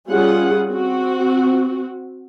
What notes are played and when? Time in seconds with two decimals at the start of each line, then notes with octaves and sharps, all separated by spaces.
0.10 G3 C#4 F4 G#4 F#5
0.71 C4 F#4